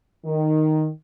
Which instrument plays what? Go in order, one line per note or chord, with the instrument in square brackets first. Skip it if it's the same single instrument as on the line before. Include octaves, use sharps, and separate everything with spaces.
[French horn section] D#3